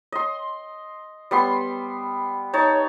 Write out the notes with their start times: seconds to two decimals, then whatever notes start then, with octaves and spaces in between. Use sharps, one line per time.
0.12 D#5 C6
1.31 G3 B3 C6
2.53 D#4 C#5 A5